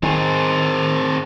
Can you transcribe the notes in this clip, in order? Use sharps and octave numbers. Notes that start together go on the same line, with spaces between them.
D#3 C4 G#4